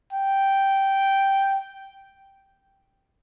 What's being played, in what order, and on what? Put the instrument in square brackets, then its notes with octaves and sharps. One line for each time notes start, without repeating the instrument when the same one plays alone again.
[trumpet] G5